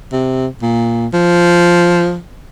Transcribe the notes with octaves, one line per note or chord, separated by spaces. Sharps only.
C3
A#2
F3